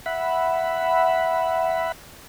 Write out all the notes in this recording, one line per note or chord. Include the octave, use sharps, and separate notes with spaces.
E5 F#5 B5